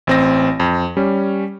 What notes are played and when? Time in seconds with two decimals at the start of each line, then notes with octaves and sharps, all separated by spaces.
0.07 A1 C4 A#6
0.60 F2
0.97 G3 C#4